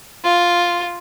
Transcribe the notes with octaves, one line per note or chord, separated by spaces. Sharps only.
F4